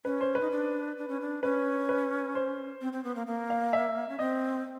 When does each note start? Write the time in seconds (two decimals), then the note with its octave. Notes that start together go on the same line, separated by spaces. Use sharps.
0.05 C#4 B4
0.21 C5
0.35 B4
0.41 D#4
0.51 D4
0.97 D4
1.08 C#4
1.21 D4
1.43 C#4 B4
1.89 B4
2.35 C5
2.81 C4
2.93 C4
3.04 B3
3.16 A#3
3.27 A#3
3.50 F5
3.73 E5
4.09 C#4
4.19 C4 D#5